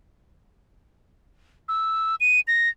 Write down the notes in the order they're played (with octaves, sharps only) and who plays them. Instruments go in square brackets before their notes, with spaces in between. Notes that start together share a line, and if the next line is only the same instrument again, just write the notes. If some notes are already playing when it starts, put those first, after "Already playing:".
[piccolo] E6
D#7
A#6